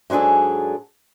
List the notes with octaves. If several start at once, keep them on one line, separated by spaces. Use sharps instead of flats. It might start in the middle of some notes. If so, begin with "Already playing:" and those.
G#2 F#3 D4 G#4 A4